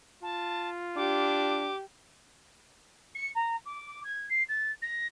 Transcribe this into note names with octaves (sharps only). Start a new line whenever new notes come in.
F4 A5
D4 G4 D6
C#7
A#5
D6
G#6
C7
A6
A#6